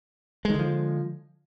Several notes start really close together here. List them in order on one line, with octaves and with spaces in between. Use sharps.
G#3 D#3 D3 F3